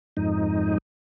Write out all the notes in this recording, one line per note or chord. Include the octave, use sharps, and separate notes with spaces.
F2 G#2 D#4